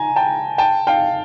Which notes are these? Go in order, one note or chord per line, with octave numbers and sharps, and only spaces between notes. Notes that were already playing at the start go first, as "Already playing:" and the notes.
Already playing: G#5 A#5
G5 A5
G5 A5
F5 G5